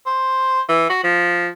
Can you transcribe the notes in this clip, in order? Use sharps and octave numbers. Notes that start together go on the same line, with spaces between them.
C5
E3
F#4
F3